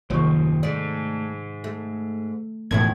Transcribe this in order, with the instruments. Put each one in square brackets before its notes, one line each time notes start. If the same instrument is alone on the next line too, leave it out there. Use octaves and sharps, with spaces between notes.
[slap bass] F#1 D#2 F3 [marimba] C3 D#3 C#6
[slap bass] G#2 [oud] A3 D5
[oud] A3
[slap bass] E1 C#2 [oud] F#2 D#3 E4 [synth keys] A2 G#6